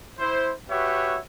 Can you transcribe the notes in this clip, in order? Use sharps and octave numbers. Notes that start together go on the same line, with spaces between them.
E4 C5
F#4 G4 B4 C#5 E5